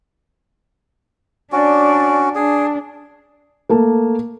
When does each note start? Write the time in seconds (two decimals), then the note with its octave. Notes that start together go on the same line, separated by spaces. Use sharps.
1.52 C#4 D4 F#4 D5
2.35 D4 G#4
3.69 A3 A#3 A5